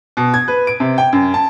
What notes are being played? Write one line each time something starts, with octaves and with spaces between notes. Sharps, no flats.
B2
G#6
B4
D7
C3
G5
F#2
A5